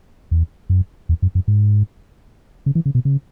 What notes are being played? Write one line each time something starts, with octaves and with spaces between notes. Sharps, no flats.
E2
F#2
E2
F#2
F#2
G#2
C#3
E3
C#3
B2
C#3